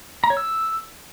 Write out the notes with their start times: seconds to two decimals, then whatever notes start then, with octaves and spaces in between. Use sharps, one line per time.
0.24 A#5
0.30 C#5
0.37 E6